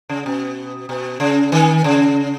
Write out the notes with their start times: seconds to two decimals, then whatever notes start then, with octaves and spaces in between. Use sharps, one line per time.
0.09 C#3
0.26 B2
0.89 B2
1.20 C#3
1.52 D#3
1.84 C#3